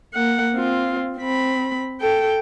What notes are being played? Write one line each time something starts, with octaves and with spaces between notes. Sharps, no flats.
A#3 F#5
C4 F4
C4 B5
A4 G5